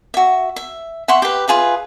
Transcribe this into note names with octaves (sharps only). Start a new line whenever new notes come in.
F#4 E5
E5
E5 F#5 C6 C#6
G4 B4
F4 G#4 B4 E5